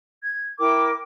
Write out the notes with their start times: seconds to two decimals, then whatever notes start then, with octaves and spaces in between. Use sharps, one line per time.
0.22 G#6
0.60 E4 A#4 G5 D6